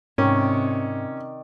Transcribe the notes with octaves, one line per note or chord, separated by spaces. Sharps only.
G#2 C3 D#3 C#4 D5